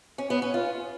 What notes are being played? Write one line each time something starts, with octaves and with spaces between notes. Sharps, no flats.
C#4
B3
C#4
F4